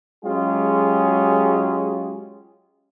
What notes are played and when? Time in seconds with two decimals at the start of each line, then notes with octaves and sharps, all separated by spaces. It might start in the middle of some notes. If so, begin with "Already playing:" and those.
0.24 F#3 G#3 C#4 F4 G4 G#4